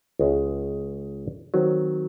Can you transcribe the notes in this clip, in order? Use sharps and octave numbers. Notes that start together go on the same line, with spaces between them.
C#2 C#3 G#3
D#3 F#3 C4